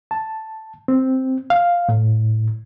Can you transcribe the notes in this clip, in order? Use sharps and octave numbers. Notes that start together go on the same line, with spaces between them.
A5
C4
F5
A2